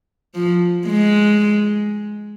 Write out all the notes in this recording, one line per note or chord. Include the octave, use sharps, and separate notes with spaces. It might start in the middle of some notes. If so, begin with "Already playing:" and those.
F3
G#3